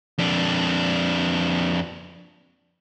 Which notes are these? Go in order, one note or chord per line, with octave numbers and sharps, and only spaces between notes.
F2 D4